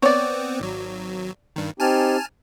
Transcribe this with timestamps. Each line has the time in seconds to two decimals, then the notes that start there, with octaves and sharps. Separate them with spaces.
0.02 B3 C4 C#5 D5
0.60 G#1 F#3
1.56 G2 D#3
1.80 C4 D#4 G4 G#5 A5 F6